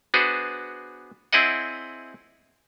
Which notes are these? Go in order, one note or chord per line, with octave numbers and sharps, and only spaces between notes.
B3 D4 F#4 G#4 B4 C5
C4 E4 G#4 D5 D#5 F#5